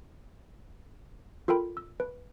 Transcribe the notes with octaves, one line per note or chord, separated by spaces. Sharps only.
F4 A4 A#4 G5 B5
E6
B4